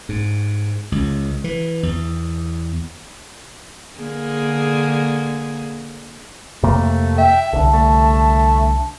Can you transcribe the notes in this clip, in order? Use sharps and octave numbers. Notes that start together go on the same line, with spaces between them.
G#2
C#2
E3
E2
D3 A#3 G#4
F2 C3 A3 A#3
E5 G5
C2 D3 A5
A3